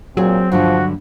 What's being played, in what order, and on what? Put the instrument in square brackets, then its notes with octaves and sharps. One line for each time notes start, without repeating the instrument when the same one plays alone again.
[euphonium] A#2 [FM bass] F#3 [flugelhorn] C4 [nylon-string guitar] G#4 C#5
[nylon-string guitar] G2 D3 A3 [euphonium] F3 [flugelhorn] F#4